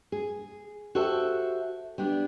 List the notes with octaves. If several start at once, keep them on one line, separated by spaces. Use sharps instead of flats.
G#4
F#4 G4 A4 C5 E5
G3 B3 D4